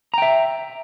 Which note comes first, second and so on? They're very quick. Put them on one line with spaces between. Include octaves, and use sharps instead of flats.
A#5 G5 E5